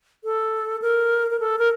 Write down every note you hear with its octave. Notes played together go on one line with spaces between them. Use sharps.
A4
A#4
A#4
A4
A#4